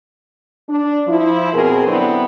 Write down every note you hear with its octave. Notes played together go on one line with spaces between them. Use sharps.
D4
F3 E4
F2 B2 C4 G#4 A#4
D3 F#3 B3 C4 D4 E4